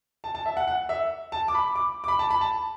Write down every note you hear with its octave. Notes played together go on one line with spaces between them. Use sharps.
A5
A5
E5
F#5
F#5
E5
A5
D6
B5
D6
D6
B5
A5
B5
A5